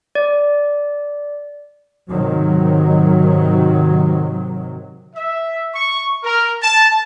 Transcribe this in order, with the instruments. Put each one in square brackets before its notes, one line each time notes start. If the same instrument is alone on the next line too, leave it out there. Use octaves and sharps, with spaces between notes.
[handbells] D5
[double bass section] G#2 C3 D#3 F#3
[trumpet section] E5
C#6
A#4
A5